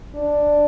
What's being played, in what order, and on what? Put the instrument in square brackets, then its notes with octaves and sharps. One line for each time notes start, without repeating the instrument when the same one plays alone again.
[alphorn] D4